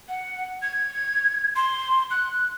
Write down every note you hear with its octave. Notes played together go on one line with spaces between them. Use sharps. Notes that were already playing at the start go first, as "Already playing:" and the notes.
F#5
G#6
C6
F#6